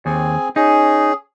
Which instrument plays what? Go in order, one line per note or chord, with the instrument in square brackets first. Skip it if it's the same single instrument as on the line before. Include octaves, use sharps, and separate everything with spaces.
[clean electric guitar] D#2 [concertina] C4 G#4 G#5
[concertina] C#4 [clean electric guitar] D#4 [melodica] G#4